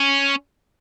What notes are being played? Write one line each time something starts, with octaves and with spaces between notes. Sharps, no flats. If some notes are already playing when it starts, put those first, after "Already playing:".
Already playing: C#4